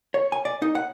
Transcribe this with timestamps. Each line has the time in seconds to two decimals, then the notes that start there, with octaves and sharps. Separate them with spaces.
0.14 C#5
0.32 G#5
0.45 D5
0.62 D#4
0.75 F#5